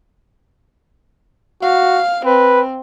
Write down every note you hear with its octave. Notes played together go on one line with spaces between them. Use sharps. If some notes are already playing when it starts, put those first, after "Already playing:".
F#4 F5
C4 B4